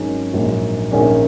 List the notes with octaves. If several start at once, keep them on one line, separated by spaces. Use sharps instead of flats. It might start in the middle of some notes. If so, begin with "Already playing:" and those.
Already playing: G#1 G#2 D#3 F#3 C#4
A#1 G#2 F#3 A#3
A#1 G#2 D#3 G#3 C#4